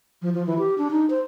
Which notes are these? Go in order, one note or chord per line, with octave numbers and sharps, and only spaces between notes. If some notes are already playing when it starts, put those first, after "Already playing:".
F3
F3
E3
G4
D4
D#4
C5